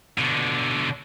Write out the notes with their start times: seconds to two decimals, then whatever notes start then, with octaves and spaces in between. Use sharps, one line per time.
0.18 B2 D3